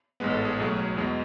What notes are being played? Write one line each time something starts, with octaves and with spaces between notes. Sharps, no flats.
A1 G#2 G#3 B3 B4
A4
G#4
B1 B2 F#3 A3 G#4
E2 B2 G#3